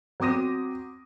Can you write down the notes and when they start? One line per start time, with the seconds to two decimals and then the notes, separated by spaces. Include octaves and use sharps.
0.20 F#3 C4 D6 D#6 A#6 D#7